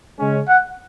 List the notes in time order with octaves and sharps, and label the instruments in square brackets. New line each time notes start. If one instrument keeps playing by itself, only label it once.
[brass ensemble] C#3 G#3 C#4
[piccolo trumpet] F#5